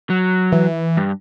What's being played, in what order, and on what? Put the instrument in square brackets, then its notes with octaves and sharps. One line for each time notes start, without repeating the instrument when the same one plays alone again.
[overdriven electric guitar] F#3
[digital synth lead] E3
[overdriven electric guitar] G2